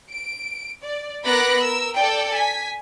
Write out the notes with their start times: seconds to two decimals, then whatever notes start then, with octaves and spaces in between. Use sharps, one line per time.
0.11 D7
0.83 D5
1.25 B3 A#4 B5 D6 F#6 A#6
1.60 A#4 E6
1.95 A4 D5 G5
2.34 G#5 B6